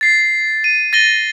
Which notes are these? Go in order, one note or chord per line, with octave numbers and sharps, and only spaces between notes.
A6 C7
D#7
A6 A#6 D#7 G7